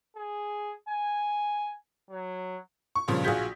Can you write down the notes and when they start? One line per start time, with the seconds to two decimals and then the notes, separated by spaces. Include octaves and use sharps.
0.16 G#4
0.88 G#5
2.10 F#3
2.95 C#6
3.08 G2 A#2 C#3 F3
3.24 A#1 F4 F#4 G#4 G6 B6